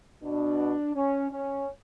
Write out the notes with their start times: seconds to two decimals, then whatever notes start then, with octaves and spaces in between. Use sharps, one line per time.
0.23 B2 D4
0.95 C#4
1.31 C#4